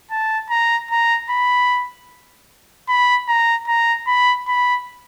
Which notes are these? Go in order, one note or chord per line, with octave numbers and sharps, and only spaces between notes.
A5
A#5
A#5
B5
B5
A#5
A#5
B5
B5